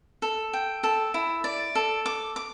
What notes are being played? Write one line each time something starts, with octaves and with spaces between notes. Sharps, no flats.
A4
G5
A4
E4
D5
A4
D6
D6